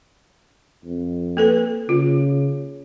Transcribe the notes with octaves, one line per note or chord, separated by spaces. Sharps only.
F2
A#3 A4 B4
C#3 F4